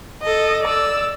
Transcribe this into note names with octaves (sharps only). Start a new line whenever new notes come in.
A4 D#5
D5 E6